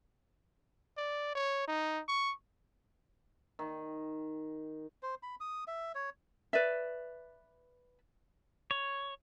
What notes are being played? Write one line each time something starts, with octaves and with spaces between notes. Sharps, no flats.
D5
C#5
D#4
C#6
D#3
C5
B5
D#6
E5
C#5
B4 D5 E5
C#5